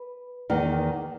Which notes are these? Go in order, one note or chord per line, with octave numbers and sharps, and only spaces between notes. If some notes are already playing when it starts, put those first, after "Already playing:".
Already playing: B4
E2 D#3 A#3